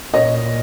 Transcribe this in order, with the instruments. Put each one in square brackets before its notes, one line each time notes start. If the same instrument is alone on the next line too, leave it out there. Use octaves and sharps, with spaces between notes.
[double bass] A#2 [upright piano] C#5 D#5